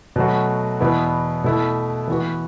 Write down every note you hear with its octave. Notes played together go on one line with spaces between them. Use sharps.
B2 F#3 A3 F#4
E2 B2 B3 E4
B2 A3 E4
E3 B3 F#4